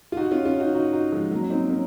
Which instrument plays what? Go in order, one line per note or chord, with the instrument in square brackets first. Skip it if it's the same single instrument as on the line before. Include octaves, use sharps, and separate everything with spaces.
[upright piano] F4
D#4 F#4
C#4 F4
C#4 F4
D#4 F#4
D#4 F#4
D#4 F#4
F3 G#3
F#3 A#3
C#4
C4 D#4
A#3 C#4